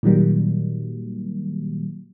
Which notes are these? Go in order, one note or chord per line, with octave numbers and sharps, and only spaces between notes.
A#2 D#3 F#3 G3 A#3